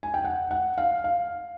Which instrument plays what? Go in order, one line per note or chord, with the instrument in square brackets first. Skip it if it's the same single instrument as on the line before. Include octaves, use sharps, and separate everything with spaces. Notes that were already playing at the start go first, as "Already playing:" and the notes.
[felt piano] G#5
G5
F#5
F#5
F5
F5